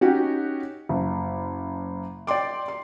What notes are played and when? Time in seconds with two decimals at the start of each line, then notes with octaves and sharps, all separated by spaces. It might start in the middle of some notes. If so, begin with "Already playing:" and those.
0.01 C#4 D#4 F#4 G4
0.89 F#1
2.27 D5 G5 C6 D6
2.68 C6